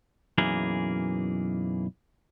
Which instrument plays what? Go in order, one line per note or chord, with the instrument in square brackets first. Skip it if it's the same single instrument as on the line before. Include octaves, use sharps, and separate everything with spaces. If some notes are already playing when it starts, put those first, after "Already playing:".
[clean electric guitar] B1 F#2 E3 A#3 G#4 A#4